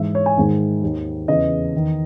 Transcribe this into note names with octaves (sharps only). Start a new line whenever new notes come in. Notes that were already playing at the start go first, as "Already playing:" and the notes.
Already playing: G#2 E3 E5
C#5
G#5
G#2 D#3
D#2 D#3
E2 C#3 E3 D#5
E2 D#3